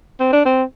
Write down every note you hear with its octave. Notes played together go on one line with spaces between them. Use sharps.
C4
D4
C4